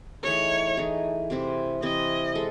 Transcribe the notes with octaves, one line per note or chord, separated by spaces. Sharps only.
E3 A3 D#4 G#4 C#5
E3 A3 D#4 G#4
C3 E3 C4 E4
C3 E3 C4 E4 D#5
G#3 A4